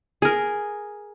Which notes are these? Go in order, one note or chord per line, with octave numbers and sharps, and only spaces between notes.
G#4 A#4